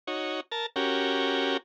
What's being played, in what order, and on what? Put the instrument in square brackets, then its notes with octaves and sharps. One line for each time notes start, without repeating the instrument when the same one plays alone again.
[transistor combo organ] D#4 F#4 C#5
A#4 A5
C#4 F#4 G4 A#4